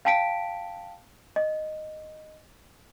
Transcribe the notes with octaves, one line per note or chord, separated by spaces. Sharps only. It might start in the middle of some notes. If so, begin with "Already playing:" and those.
F5 G5 A5 B6 D7
D#5